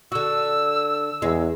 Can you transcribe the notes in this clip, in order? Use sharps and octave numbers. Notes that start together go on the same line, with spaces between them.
D3 F#4 E6
E2 G#3